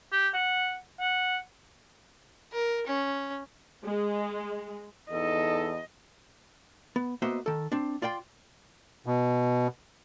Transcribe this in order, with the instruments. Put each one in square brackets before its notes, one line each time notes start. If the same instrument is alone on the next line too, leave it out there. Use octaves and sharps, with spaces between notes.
[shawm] G4
F#5
F#5
[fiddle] A#4
C#4
[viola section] G#3
[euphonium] E2 [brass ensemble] D#4 A4 [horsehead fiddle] D#5
[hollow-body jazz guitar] B3
A#3 B3 F#4 C5 D#5 E5
D#3 A4
C4 D4
F4 D5 G5 C6
[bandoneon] B2